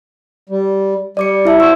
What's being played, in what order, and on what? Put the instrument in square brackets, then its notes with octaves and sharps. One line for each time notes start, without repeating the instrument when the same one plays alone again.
[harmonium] G3
[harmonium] G3 [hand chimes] D5 D6 C#7
[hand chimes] E4 E5 A5
[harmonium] F#4 C5 [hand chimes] E6